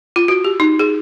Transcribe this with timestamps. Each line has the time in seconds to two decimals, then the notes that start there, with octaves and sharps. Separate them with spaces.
0.16 F4
0.28 F#4
0.44 G4
0.60 D#4
0.79 G#4